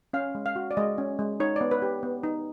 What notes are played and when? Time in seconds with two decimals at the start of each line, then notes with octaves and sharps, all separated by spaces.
0.13 C#4 F5
0.35 G#3
0.46 F5
0.56 F#4
0.71 D5
0.77 G#3 D#5
0.98 C#4
1.19 G#3
1.40 D#4 C#5
1.56 B3 D5
1.71 B4
1.82 G4
2.03 B3
2.23 D#4